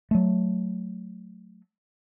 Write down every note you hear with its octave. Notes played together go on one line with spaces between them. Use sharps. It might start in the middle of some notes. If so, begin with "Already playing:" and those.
F#3 A3